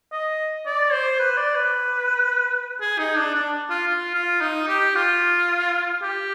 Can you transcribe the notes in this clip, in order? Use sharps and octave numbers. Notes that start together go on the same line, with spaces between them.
D#5
D5
C5
B4
D5
B4
G#4
D#4
D4
D4
F4
F4
F4
D#4
G4
F4
G4